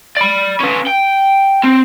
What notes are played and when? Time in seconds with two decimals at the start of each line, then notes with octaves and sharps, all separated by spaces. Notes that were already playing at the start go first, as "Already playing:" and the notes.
0.17 D5 B5
0.60 C#4 B4
0.87 G5
1.64 C4